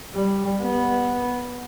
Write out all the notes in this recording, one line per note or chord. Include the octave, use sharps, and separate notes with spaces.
G3
B3